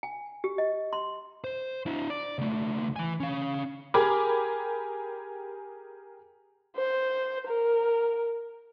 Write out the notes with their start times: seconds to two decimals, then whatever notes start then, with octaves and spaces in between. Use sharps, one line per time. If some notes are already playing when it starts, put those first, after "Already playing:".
0.03 G#5
0.44 G4
0.58 D#5
0.93 C6
1.44 C5
1.86 D4 E4
2.10 D5
2.39 C#2 A3
2.96 E3 G#5
3.20 C#4 F5
3.94 G4 G#4 A#4 G#5 B5 D6
6.77 C5
7.47 A#4